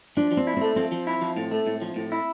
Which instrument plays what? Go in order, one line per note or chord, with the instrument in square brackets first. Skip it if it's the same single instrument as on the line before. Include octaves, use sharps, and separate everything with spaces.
[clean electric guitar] F3 [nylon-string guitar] D4
[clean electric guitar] F3
[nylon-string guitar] C4
[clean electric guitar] E4
[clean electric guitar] A3 [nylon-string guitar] C4
[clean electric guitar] F3 [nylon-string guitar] C4
[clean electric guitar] F3
E4
F3
A2
A3
A2
F3
A2
E4